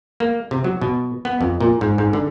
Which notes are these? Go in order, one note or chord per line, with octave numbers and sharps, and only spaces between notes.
A#3
C3
F#3
B2
B3
F2
A#2
G#2
G#2
D3